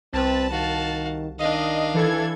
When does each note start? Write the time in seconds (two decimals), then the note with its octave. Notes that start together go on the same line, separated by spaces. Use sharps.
0.13 C2 C4 B4 A5
0.51 D#3 F#4 F5
1.39 D#3 D4 D#5 F5
1.94 E3 A4 G#6